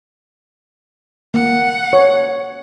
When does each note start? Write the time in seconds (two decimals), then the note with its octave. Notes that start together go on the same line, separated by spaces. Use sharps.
1.34 A#3 F#5
1.93 C#5